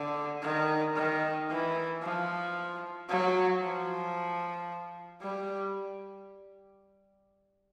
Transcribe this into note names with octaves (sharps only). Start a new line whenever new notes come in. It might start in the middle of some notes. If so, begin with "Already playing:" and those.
Already playing: D3
D#3
D#3
E3
F3
F#3
F3
G3